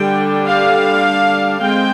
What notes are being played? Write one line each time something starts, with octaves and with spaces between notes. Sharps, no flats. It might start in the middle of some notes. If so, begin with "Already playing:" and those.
Already playing: D3 G3 D4 G5
F5
G#3 C4 G5